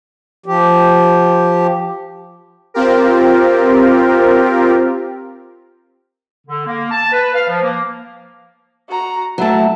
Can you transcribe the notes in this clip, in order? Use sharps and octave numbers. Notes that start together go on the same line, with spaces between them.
F3 G4
C4 F4 G4 A#4
D3
A#3
A5
B4
F5
F3
A#3
F#4 A#5
F#3 A3 E4 A5